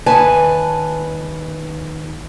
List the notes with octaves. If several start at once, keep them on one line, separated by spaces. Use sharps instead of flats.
D#2 B4 G#5 A5